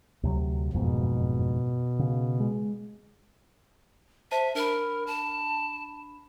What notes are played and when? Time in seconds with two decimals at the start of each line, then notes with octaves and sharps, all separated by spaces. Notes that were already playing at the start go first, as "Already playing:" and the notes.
0.23 D2 C3 F#3
0.73 F#1 F2 G#2 B2
1.99 C#3
2.40 G#3
4.31 C5 E5 A5 D#7
4.55 D4 A#4 B5
5.07 A5